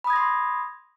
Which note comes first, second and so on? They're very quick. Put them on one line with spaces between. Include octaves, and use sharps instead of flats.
B5 D#6 G#6 A#6 C6